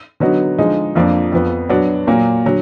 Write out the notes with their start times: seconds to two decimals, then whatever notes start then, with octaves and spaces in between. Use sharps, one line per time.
0.20 D3 F#3 B3 D#4 F#4
0.58 D3 F3 G#3 D#4
0.95 F2 F3 A#3 D4
1.32 F2 F3 B3
1.69 F#3 B3 D4 F#4
2.07 A#2 F#3 A#3
2.46 D3 F#3